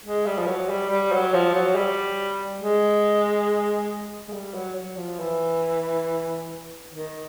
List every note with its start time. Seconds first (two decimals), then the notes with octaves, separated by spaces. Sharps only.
0.05 G#3
0.26 G3
0.38 F3
0.47 F#3
0.69 G3
0.90 G3
1.12 F#3
1.34 F3
1.55 F#3
1.75 G3
2.62 G#3
4.28 G#3
4.33 G3
4.54 F#3
4.76 F#3
4.97 F3
5.19 E3
6.90 D#3